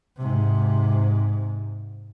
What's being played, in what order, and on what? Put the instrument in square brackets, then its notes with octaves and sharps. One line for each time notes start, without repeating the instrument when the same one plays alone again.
[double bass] G#2 C3